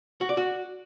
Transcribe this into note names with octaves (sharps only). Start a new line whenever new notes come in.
F#4
D5
F#4